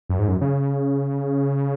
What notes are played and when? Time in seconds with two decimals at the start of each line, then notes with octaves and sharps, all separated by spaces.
0.09 F#2
0.19 G#2
0.28 F#2
0.41 C#3